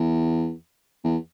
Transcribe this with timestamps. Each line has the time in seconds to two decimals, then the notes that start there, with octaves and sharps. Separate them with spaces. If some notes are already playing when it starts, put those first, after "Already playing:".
Already playing: E2
1.04 E2